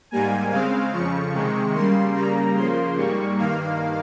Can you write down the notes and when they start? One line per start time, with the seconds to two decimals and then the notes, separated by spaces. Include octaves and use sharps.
0.11 G#2 G3 A#3 G#5
0.51 C#3 G#3 C4 F5
0.93 F2 C#3 F3 C#6
1.34 C3 D#3 G#3
1.74 C#3 G3 A#3 C6
2.15 C#3 G3 A#3 A#5
2.56 C#3 F3 A#3 C6
2.97 G#2 G3 A#3 C#6
3.38 G2 D#3 A#3 F5